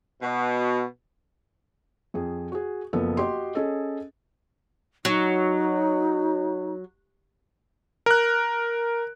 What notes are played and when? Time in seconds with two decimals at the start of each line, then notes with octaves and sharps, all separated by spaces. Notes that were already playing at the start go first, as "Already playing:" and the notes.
0.22 B2
2.14 F2 G#4
2.52 F#4 G#4
2.93 F#1 F3 B3 A4
3.17 F#4 G4 D#5 C6
3.55 C#4 G#4 A4 D#5
5.05 F#3 D#4
8.06 A#4 F#6